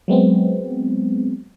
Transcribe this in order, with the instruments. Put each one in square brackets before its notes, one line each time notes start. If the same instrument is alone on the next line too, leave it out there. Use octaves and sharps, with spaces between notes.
[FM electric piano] F#3 G#3 B3 C4